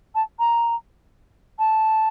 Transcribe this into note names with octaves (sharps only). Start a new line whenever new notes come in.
A5
A#5
A5